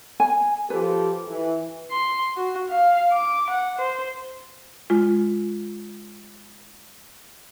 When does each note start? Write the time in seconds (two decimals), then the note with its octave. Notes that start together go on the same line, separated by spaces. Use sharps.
0.20 G#5
0.70 F3 G4 A4 B4
1.27 E3
1.91 C6
2.37 F#4
2.70 F5
3.13 D6
3.50 F#5
3.79 C5
4.90 G#3 F4